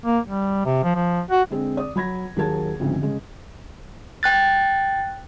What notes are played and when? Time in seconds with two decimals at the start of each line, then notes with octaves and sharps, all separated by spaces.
0.06 A#3
0.26 G3
0.66 C3
0.84 F3
0.95 F3
1.31 F#4
1.50 D3 G#3 C4 G#4
1.77 D5 D#6
1.96 F#3 B5 G#6 A#6
2.36 D#2 F#3 G#4 A#4 A5 G#6
2.79 D2 G#2 C#3 F3 C4
3.02 C#3 G#3
4.23 G5 F#6 A6